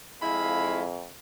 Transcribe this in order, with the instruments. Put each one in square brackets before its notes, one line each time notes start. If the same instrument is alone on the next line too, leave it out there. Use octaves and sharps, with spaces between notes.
[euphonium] F2 [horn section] G#3 E4 F5 [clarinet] B5